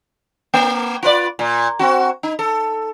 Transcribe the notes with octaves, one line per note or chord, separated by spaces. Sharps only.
A#3
F4 B4 D5
A#2
C4 F#4
D#4
A4